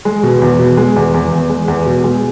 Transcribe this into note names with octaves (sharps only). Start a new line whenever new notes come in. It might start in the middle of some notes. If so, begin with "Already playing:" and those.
G#3
B2
E2
B2
G#3
E2
E2
E2
G#3
E2
B2
G#3